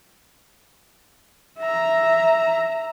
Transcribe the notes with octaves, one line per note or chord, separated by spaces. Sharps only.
E5 A#5